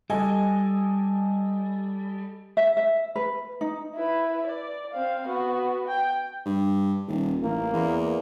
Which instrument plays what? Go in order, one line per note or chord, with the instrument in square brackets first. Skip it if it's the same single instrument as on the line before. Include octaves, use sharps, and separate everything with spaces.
[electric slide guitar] G3 [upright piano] A4 D#5 G#5
[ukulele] E5
E5
B4
D#4
[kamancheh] E4 B4
D5
C4 F5
B3 F#4
G5
[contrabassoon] G2
D#1
[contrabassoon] A1 [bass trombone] A#3
[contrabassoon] E2